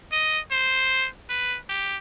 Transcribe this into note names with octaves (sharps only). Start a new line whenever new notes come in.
D#5
C5
B4
G4